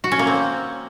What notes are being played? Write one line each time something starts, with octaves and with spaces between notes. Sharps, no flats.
F#4
C#4
A#3
C4